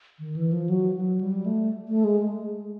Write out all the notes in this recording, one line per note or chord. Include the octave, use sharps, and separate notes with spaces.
D#3
E3
F3
F#3
F#3
G3
A3
A3
G#3